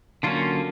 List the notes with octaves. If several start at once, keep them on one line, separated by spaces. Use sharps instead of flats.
D3 F#3 A#3 C#4 F4